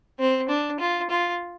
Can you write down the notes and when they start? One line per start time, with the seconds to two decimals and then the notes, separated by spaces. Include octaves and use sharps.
0.19 C4
0.49 D4
0.80 F4
1.10 F4